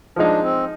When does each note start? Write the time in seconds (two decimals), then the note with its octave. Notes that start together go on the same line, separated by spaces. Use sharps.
0.16 F3 G#3 D4 D#4
0.42 C4